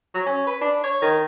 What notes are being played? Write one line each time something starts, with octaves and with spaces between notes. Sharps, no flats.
F#3
C#4
B4
D4
C#5
D#3